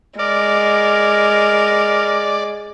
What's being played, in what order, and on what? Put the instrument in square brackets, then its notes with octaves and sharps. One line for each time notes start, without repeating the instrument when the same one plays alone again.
[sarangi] G#3 [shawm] A#4 [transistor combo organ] D5